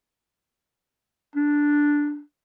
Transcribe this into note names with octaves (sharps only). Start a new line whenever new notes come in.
D4